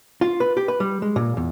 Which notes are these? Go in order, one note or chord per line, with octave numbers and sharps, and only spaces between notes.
F4
B4
G4
B4
G3
G#3
A#2
E2